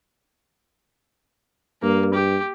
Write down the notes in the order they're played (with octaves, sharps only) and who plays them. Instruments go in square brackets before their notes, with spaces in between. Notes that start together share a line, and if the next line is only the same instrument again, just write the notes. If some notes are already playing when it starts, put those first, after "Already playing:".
[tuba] G2 [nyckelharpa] A#3
[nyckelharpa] G4